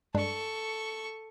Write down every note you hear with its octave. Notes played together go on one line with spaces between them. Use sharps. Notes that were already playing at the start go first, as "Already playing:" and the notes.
G2 G#3 D4 A4 C#6